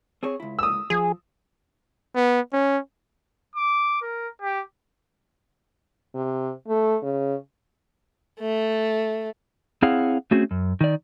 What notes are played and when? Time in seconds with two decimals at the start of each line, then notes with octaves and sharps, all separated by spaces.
0.23 C4 G#4 C#5
0.40 C#2 E4
0.59 D#6 E6
0.90 F3 G#4
2.15 B3
2.53 C#4
3.56 D6
4.02 A#4
4.42 G4
6.15 C3
6.68 A3
7.03 C#3
8.40 A3
9.82 C4 E4 G#4 C#5 F5 F#5
10.31 A3 C4 C#4 F#4 G#4
10.51 F#2
10.81 D#3 D5